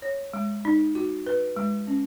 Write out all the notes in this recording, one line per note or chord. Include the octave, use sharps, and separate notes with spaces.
C#5
G#3
D#4
F#4
B4
G#3
C#4